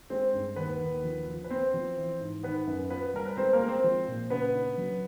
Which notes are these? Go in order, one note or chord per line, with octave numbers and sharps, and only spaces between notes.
G#3 C4 C5
G2
D#2 B3 B4
D#2
F3
F3
B4
B3 C4 C5
F3
E3
G#2
D#3 B3 B4
F#2
B3 F4 B4
G3 A#4
B4
G#3 C4 C5
A#3 A#4
G#3
C4 C5
F3
A#2
C#3 B3 B4
D4
F#3